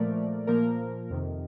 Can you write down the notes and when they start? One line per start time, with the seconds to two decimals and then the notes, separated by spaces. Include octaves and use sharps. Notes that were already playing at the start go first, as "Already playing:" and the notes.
Already playing: A#2 F3 A3 A#4 D5
0.47 A#2 F3 A#3 A#4
1.10 F2 C3 D#3